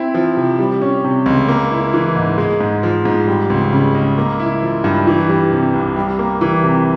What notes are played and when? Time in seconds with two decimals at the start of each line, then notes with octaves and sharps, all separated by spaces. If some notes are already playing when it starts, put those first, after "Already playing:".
Already playing: C4 E4
0.14 F3
0.37 C3
0.59 G3
0.82 C#4
1.04 C3
1.26 C#2
1.48 A#3
1.71 E4
1.93 E3
2.16 G#2
2.38 G#3
2.61 G#2
2.83 F3
3.05 G#2
3.28 G3
3.50 C#2
3.73 C#3
3.95 C#2
4.18 A#3
4.39 E4
4.62 F3
4.84 G2
5.07 E3
5.29 G3
5.52 C3
5.74 C2
5.96 G3
6.19 A#3
6.41 E3
6.64 C3